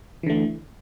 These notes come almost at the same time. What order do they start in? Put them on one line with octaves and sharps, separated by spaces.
E3 D3 A3